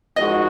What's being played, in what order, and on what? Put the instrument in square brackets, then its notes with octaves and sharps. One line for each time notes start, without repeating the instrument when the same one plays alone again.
[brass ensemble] A#1 G#2 G#3 F#4 [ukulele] D#5